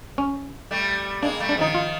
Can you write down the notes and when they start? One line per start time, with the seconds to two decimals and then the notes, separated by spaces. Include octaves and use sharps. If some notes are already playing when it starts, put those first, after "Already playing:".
0.18 C#4
0.71 G3 A3
1.22 G#3 A#3 D4
1.40 G3 A3
1.49 D4
1.57 D#3 F3 D#4
1.74 F4